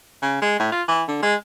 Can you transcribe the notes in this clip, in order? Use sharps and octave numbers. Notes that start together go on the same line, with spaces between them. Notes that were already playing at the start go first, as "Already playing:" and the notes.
C#3
G#3
A2
F4
E3
D3
G#3